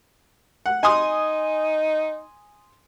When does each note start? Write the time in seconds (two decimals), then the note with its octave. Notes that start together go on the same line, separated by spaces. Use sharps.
0.66 F#5
0.83 D#4 G#5 C6 D#6